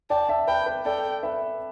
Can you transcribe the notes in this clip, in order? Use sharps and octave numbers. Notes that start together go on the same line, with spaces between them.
D5 G5 A5
E5 A5
B4 E5 G5
B4
A4 D5 G5
B4 E5